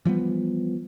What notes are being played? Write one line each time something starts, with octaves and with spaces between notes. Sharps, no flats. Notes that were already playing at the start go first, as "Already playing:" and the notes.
E3 F3 G3 B3